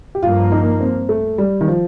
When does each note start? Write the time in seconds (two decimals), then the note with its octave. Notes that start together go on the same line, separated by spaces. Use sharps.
0.15 G4
0.23 G2 F3 A#3 F4
0.52 D#4
0.81 C4
1.09 A3
1.38 G3
1.61 D#3
1.68 F3